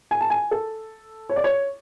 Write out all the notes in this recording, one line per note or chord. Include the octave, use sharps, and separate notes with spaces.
G#5
A5
G#5
A4
C#5
D5
C#5